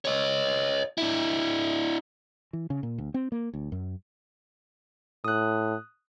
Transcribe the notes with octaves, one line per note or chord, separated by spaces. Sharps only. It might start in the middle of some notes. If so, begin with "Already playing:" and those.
C#5 D#5
D4 E4
E3
C#3
A#2
D2
C4
A#3
D2
F#2
A2 D#6 F#6